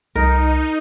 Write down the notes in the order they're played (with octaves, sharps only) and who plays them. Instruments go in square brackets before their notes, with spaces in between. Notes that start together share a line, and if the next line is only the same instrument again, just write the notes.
[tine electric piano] C2 [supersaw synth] D#4 [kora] A#4